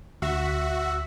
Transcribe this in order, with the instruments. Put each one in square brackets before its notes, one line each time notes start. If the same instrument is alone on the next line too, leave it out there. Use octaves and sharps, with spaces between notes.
[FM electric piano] D2 [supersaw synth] F#4 [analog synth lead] E5